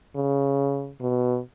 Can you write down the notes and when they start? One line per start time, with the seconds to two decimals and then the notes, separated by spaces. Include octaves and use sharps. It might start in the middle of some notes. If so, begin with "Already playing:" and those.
0.16 C#3
1.01 B2